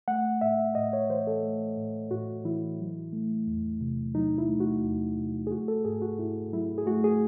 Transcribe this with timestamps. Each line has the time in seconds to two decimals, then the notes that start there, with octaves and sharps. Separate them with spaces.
0.08 A3 F#5
0.41 A2 E5
0.75 A2 D#5
0.93 C#5
1.09 E3 C5
1.27 A4
1.43 A3
1.78 A2
2.11 A2 F#4
2.45 E3 E4
2.79 F#3
3.13 A3
3.48 E2
3.81 C3
4.15 F#3 D#4
4.38 E4
4.49 A3
4.60 F#4
4.83 E2
5.17 C3
5.47 G#4
5.51 A3 F#4
5.68 A4
5.85 G#2 G#4
6.02 F#4
6.19 G#2 E4
6.53 F#3 E4
6.78 G#4
6.87 A3 F#4
7.04 G#4